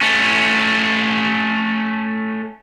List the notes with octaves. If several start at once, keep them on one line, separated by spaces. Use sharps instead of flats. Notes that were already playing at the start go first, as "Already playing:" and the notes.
A3 C#4